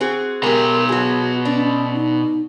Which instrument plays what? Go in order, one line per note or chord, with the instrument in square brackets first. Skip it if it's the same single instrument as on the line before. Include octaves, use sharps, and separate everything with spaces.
[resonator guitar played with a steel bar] C4 F#4 G#4
[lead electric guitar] B2 A#5 [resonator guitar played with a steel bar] G#3 G4 [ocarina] A#4
[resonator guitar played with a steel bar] F#3 G#4 [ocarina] F#4
[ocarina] C#4 [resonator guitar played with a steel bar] D4
[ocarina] D#4